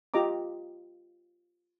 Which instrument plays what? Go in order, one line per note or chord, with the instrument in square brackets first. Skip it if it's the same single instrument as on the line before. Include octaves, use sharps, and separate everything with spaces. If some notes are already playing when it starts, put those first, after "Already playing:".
[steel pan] F4 G4 D#5 A#5 D6